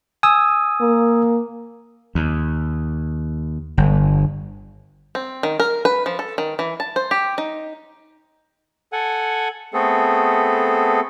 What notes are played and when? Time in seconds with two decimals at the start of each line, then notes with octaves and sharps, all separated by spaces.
0.23 G#5 D#6 E6
0.81 A#3
2.15 D#2
3.77 G1
5.15 C4
5.43 D#3
5.60 A#4
5.85 B4
6.06 F3
6.19 A4
6.38 D#3
6.59 E3
6.80 A5
6.96 C5
7.11 G4
7.38 D#4
8.93 A4 F#5 G#5
9.73 A3 B3 C4 G#4 A4